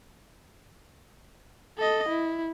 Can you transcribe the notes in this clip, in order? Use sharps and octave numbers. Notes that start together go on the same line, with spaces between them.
A4 D#5
E4